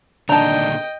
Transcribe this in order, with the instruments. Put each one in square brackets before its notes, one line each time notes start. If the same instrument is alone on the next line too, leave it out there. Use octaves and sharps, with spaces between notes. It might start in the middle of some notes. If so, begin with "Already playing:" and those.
[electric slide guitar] A#2 D3 D#3 [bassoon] D4 [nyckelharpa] D#5 G5 [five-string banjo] A5 A#5